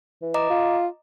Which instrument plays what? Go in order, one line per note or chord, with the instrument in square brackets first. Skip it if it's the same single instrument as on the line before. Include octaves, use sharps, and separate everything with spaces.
[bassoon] E3
[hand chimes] D#5 A#5 D6
[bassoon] F4